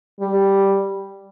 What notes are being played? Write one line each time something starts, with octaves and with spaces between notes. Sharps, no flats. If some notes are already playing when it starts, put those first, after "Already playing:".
G3